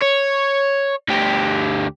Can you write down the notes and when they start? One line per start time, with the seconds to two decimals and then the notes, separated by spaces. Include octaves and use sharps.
0.02 C#5
1.09 D2 G4